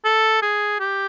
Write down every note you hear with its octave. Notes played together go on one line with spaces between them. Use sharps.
A4
G#4
G4